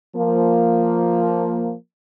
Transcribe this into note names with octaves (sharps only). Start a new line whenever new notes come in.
F3 A#3